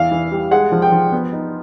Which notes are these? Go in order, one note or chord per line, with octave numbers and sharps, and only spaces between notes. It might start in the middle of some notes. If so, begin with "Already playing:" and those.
Already playing: E2 E3 F5
E3
G3
G#3 F#5
F3
G5
F3
B3
D#4